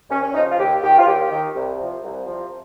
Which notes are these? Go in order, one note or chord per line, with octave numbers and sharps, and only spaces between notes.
D#2 C#4
C#4
C#3 F3 D#4
F4
D#2 G4
D#3 G4
F4
D#2 G4
D#3
C2
C3 F3
C2
C3 F3